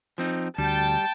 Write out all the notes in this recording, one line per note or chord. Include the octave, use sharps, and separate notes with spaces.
F3 C4 D#4
D2 G3 G5 A5